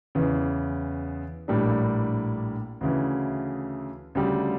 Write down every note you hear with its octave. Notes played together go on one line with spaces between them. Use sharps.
E2 C#3 E3
A#1 A2 G3 A#3 D4
D2 C#3 E3
D2 C#3 G3